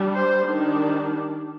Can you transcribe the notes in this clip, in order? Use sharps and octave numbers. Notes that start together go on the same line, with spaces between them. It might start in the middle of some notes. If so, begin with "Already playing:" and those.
Already playing: G3 D4
C5
D#3 G3 D4